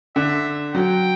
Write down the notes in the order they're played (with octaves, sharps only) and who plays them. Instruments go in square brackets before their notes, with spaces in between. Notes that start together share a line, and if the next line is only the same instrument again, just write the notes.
[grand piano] D3 [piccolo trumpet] E5
[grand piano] F#3 [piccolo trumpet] G5